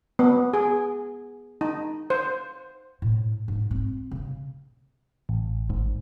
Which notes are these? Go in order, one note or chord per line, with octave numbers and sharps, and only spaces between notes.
B3
G#4
D#4
C5
A2
G#2
C4
C#3
A1
G#1 G#2